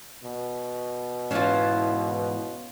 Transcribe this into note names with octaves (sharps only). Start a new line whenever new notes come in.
B2
G#2 E3 C#4 E4 F4